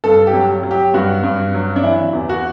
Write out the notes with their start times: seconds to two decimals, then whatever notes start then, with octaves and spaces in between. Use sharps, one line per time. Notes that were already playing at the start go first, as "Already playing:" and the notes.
0.04 G2 A4
0.27 G4
0.34 F#3
0.63 F#3
0.71 G4
0.94 G2 F#4
1.23 G2
1.55 F#3
1.76 D4
1.83 E3 E4
2.13 E2
2.29 F#4